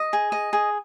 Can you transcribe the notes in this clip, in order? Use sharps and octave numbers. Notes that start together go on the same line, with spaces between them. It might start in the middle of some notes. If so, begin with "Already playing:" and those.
Already playing: D#5
G#4
D#5
G#4